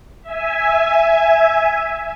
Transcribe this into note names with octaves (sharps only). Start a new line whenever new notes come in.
E5 G#5